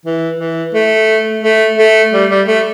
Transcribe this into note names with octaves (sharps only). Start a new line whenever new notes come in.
E3
E3
A3
A3
A3
G3
G3
A3